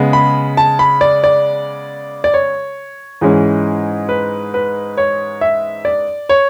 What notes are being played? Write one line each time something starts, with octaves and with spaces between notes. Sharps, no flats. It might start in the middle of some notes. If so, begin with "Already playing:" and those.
Already playing: C#3 G#3 B3
B5
A5
B5
D5
D5
D5
C#5
G#2 E3 G#3 C#4
B4
B4
C#5
E5
D5
C#5